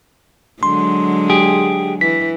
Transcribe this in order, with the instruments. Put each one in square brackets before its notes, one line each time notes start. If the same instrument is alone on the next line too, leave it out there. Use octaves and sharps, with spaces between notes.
[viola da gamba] D3 F#3 G#3 [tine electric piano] C6
[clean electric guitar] G4 G#4
[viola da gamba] E3 [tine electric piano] B6